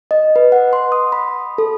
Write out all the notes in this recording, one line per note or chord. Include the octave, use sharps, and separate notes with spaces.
D#5
B4
F#5
C6
D#6
B5
A4